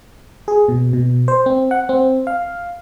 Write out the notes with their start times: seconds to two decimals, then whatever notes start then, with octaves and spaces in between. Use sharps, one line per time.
0.48 G#4
0.68 B2
0.93 B2
1.28 C5
1.46 C4
1.71 F#5
1.89 C4
2.27 F5